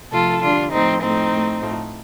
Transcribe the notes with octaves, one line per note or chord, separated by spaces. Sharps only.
C3 F3 A3 F4 A4
D3 G3 D4 F4
A2 F3 A3 C4 D#4
A2 F3 A3 C4 D#4
A2 A3
A2 F3 A3